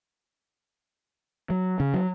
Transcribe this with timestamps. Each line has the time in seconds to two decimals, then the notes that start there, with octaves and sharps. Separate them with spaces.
1.50 F#3
1.80 C#3
1.94 F#3